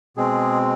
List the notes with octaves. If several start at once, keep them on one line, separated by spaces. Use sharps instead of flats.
B2 G#3 C4 G#4